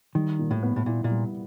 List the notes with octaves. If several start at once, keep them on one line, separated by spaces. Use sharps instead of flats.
D#3 G3
A#2
A2
B3
A2
A#2 E4
A#2
G3